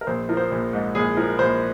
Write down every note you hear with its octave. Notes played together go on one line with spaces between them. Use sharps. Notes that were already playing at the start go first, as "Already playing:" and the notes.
A#4
A#1 C5
F3 A#4
C5
A#1
G#2
A#1 G#4
F3 A#4
A#1 C5